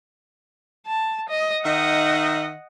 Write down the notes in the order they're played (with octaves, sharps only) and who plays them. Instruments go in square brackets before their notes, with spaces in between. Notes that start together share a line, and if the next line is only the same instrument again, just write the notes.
[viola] A5
D#5
[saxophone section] D#3 D#4 E5 [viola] D#5 F#5